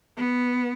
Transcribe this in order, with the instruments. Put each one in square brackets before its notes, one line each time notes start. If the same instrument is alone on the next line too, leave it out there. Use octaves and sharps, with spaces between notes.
[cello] B3